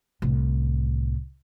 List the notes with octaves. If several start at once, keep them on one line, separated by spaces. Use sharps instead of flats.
C2 A2